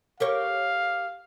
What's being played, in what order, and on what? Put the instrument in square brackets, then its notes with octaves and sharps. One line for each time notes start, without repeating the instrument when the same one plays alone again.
[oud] G4 A#4 C#5 [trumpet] F5